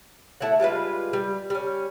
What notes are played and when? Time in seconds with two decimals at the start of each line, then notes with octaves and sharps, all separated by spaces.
0.41 A3 E4 C#5 F#5
0.60 G3 G#3 F4 B4
1.13 G3
1.50 G3 C#4